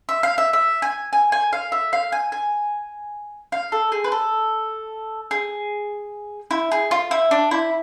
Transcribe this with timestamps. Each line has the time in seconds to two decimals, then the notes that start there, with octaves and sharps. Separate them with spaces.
0.09 E5
0.23 F5
0.38 E5
0.53 E5
0.82 G#5
1.13 G#5
1.32 G#5
1.53 F5
1.72 E5
1.93 F5
2.12 G#5
2.32 G#5
3.52 F5
3.72 A4
3.92 G#4
4.04 B4
4.12 A4
5.31 G#4
6.51 E4
6.72 G#4
6.91 F4
7.11 E4
7.31 D4
7.51 E4